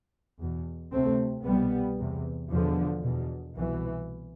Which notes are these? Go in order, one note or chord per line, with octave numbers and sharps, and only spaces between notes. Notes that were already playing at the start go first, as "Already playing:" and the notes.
E2 B2
D2 C3 A3 C4
C2 B2 G3 B3
E2 C3
E2 B2 D3 F3
E2 B2
C2 B2 E3